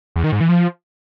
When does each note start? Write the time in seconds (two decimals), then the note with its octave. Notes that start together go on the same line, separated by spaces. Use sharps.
0.16 E2
0.24 D#3
0.32 G#2
0.41 E3
0.49 F3